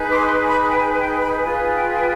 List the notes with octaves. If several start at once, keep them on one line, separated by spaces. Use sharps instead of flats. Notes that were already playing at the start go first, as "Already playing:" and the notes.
Already playing: D#4 G#4 B4
D6
C6
B5
G5
G#5
G5
B5
F4 G#4 B4 G#5
G5
G5